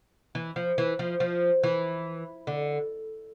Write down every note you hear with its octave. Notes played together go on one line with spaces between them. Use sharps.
E3
F3
E3
F3
F3
E3
D3